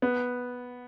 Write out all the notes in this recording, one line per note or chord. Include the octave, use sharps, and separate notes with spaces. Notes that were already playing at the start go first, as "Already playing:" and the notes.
B3